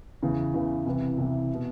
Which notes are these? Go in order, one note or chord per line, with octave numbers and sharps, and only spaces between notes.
E2 C#3 E3
E2 C#3 E3
C2 C3 E3
C2 C3 E3
B2